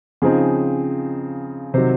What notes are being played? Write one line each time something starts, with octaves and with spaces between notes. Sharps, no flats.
C#3 F3 C4 D#4 G#4
C3 D#3 F#3 C5